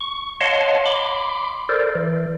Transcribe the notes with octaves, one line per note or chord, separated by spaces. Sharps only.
C#6
C#5 D#5 F5 F#5 A5 C6
B5 C6 D6
A4 A#4 C5 D5
E3